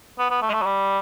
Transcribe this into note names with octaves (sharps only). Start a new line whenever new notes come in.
B3
B3
A3
G#3
A3
F#3
G3